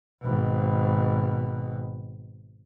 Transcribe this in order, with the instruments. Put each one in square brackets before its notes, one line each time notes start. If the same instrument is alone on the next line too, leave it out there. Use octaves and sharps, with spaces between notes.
[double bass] G#1 B2